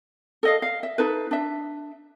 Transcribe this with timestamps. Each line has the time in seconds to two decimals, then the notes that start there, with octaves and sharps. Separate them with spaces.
0.43 A4 D#5 F5
0.62 F5
0.83 E5
0.98 D#4 A4 B4
1.31 D4 E5